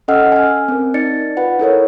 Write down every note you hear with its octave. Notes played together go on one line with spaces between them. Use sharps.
C#4 A4 D#5 F#5 E6 F6
G#5 F6
C4 A#4
D#4 D5 A6 C#7
F4 B4 F#5
E4 A4 A#4 C#5